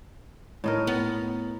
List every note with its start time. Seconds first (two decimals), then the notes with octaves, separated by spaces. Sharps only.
0.64 A2 D#4 A#4
0.87 B3